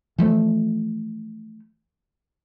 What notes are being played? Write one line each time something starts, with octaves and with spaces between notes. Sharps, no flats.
E3 F3 A3